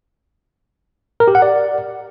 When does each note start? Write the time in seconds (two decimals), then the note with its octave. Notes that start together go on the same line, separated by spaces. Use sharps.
1.20 A#4
1.28 G4
1.35 F#5
1.42 D5